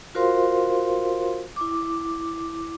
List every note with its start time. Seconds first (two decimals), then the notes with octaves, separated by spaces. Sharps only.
0.15 F4 F#4 A#4 C5 F5 C6
1.56 E4 D6